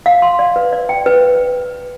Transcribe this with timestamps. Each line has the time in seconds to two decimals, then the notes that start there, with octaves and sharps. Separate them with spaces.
0.06 F5
0.22 C6
0.39 D5
0.56 B4
0.72 D5
0.89 G5
1.06 B4